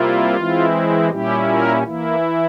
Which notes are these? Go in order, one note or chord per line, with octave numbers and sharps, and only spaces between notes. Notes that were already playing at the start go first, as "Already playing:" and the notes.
Already playing: C3 G3 A#3 E4 F4
E3 G#3 C4 E4
A#2 G3 C#4 E4 G4
A#3 A#4
E3 A#3 E4